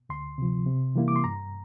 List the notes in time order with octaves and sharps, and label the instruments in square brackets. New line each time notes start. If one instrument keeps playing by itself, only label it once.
[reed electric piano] D2 C6
C3 F3
C3
E3 G3 A#3 E4
D6
C6
G2 A#5